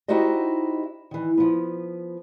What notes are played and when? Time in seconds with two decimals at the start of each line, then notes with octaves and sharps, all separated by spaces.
0.08 D#4 E4 F#4 G4 C5 D#5
1.11 D#3 E3
1.37 F3 B3